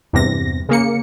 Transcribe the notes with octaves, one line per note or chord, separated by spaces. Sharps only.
E2 G2 C3 A#6
C#3 A#3 C#7